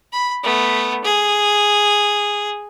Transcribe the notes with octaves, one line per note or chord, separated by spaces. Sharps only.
B5
A3 B3
G#4